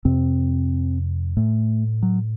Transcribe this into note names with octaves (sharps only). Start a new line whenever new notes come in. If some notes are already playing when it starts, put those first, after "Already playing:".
F2 C3 C4
A2 A3
F#3